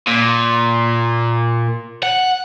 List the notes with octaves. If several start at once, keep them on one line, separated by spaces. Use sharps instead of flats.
A#2
F#5